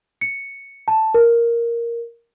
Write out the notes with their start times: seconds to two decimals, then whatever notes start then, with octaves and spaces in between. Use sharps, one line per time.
0.21 C#7
0.88 A5
1.14 A#4